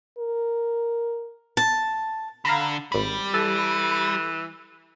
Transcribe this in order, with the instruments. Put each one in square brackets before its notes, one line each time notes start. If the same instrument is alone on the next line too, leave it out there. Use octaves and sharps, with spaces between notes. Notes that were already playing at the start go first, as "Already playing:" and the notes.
[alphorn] A#4
[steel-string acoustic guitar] A5
[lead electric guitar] D3 [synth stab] F5 A#5 B5
[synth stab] G#1 B5 [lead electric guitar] G3
[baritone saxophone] E3 [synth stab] A4